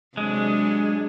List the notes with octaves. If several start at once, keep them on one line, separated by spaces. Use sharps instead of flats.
C3 F#3 G#3 D4